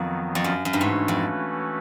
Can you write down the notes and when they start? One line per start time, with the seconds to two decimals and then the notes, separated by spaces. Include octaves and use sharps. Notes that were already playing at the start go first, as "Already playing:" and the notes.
Already playing: F2 D#3 F#3 B3
0.35 F2
0.44 F#2
0.65 F#2
0.73 G2
0.80 G#2 E3 A3 C#4 F#4 B4
1.08 F2